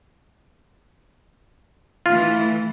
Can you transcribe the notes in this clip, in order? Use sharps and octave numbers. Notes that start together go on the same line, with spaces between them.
E3 A3 F4